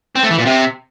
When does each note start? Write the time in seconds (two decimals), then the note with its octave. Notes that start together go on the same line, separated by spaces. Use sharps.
0.16 C4
0.23 A3
0.31 E3
0.38 A#2
0.45 C3